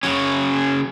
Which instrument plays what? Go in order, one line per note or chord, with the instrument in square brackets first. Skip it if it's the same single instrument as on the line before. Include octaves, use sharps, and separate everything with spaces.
[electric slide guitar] C#3 F#3 C#4